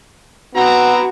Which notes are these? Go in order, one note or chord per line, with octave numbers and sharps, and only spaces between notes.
B3 C4 E4 F#4 A#5